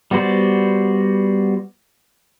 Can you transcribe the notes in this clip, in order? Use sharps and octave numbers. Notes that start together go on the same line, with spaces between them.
G3 B3 F#4 C5 D5